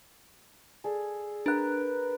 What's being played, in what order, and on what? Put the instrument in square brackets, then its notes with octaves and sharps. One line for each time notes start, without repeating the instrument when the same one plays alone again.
[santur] G#4 A4 D5
[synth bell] D4 F#6 [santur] A#4 B4 G5